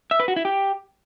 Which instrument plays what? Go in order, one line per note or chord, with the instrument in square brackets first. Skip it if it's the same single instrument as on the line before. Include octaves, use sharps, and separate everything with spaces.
[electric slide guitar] E5
B4
F#4
E4
G4